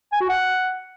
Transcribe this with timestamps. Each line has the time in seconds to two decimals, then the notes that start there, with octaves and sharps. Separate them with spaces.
0.12 G#5
0.21 F#4
0.29 F#5